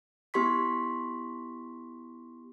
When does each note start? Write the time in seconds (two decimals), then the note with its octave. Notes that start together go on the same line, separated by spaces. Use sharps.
0.34 B3 E4 G4 C6 C#6 B6